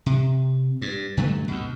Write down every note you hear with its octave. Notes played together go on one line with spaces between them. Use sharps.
C3
G2
G2 D3 F#3 A3
D2 B2